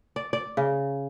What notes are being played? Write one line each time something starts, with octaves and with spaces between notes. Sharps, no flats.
D5
D5
C#3